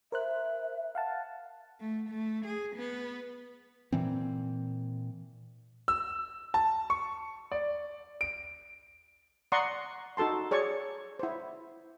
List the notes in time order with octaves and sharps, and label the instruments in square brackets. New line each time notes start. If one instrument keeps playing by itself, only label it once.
[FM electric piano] A#4 C5 F#6 [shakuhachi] E5
[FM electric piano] F5 F#5 A5
[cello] A3
A3
G#4
B3
[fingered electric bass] A#2 E3 C4
[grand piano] E6
A5
C#6
D5
D7
[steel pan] D5 F#5 A#5 C6 C#6 D#6
D#4 F#4 A4 A5 C6
G#4 C#5 D5 C#6
E4 C5